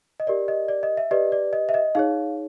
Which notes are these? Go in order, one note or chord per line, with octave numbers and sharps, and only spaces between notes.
D#5
G4 A#4 D5
D#5
D5
D#5
E5
G4 B4 D5 D#5
D5
D#5
E5
D#5
D#4 G#4 C#5 F5